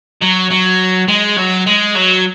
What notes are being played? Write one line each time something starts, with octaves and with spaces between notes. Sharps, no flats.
F#3
F#3
G#3
F#3
G#3
F#3